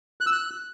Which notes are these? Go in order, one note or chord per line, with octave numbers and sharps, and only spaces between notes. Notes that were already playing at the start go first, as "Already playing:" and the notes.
F#6
E6
F#6